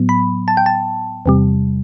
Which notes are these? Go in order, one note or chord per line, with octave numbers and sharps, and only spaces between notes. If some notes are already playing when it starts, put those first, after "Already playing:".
Already playing: A2 F#3 B3
B5
A5
G5
A5
E2 C3 G3